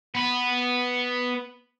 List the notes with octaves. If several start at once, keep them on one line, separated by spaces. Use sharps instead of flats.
B3 B4